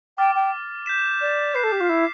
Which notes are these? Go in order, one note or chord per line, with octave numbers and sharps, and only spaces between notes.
G5 D6 F6 A6
G5
G6 B6 E7
D5
B4 G6 C7 E7
A4
G4
F4
E4